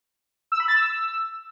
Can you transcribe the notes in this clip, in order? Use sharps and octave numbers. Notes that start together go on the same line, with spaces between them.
E6
B5
A6
E6